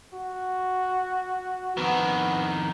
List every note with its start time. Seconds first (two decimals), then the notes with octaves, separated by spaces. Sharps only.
0.13 F#4
1.77 F2 D#3 B3